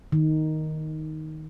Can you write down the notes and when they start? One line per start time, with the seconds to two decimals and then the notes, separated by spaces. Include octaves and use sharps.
0.12 D#3